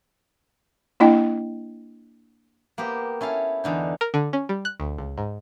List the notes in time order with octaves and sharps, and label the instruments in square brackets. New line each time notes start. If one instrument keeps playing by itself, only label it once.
[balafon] A#3 D4 E4 D#5 G5
[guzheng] A#3 B3 G4 C5
C#4 E4 A4 F5
E2 D3 D#4
[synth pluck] A#4
D3
C#4
G3
F#6
D2
C#2
G#2